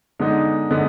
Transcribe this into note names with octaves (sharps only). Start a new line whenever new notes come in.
D3 G#3 B3 D#4
D3 G#3 B3 D#4